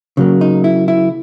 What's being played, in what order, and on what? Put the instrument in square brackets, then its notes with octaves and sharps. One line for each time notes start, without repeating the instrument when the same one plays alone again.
[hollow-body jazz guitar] C#3 F#3 A#3
D#4
E4
E4